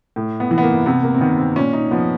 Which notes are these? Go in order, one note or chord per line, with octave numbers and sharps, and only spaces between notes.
A2
B3
E3
B3
A#3
C3 B3
A#3
C4
D#3 B3
C4
A#2 C#4
D#4
F3 B3